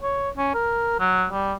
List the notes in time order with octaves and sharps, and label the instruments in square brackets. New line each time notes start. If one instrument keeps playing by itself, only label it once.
[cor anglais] C#5
C#4
A#4
F#3
G3